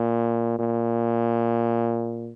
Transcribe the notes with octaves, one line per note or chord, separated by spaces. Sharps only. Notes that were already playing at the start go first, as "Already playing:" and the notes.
Already playing: A#2
A#2